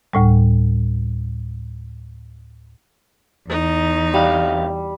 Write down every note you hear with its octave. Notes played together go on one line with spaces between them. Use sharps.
D2 A2 G3
E2 D#4
C2 G3 F5